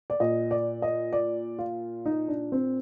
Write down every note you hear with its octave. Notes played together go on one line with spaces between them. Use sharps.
D5
A#2 D#5
D5
D#5
D5
F4
D#4
D4
C4